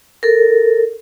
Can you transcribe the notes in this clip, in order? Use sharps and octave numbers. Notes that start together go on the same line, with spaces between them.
A4 A#4